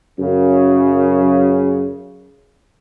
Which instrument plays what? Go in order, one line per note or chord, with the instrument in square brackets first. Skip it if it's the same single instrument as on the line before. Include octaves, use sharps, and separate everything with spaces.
[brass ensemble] F#2 C#3